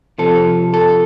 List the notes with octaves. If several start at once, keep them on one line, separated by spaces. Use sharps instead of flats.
C3 F3 A4
A4